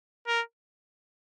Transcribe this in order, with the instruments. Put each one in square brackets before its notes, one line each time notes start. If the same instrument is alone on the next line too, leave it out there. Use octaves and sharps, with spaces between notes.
[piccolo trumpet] A#4